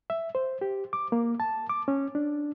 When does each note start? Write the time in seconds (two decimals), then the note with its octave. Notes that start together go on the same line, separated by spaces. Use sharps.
0.10 E5
0.35 C5
0.61 G4
0.93 D6
1.12 A#3
1.40 A5
1.70 D6
1.88 C#4
2.15 D4